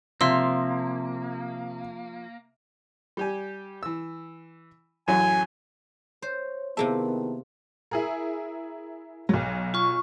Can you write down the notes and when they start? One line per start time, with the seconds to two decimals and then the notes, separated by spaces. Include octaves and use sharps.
0.21 C3 F3 A#3 E5 C6 E6
3.17 G3 G4 G#5
3.83 E3 E6
5.08 A1 F#2 F#3 G#5
6.22 C5 C#5
6.77 C3 D#3 A#3 B3 E4 G#4 E5 A5
7.91 E4 G#4 A#4
9.29 B1 F#3
9.74 F4 C#6